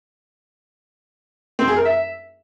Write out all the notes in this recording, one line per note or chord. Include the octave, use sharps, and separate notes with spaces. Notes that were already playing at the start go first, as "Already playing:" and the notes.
C4
G#4
A#4
E5